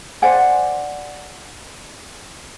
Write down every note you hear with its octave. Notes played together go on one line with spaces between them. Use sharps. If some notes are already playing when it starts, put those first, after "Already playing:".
C5 D5 F#5 G#5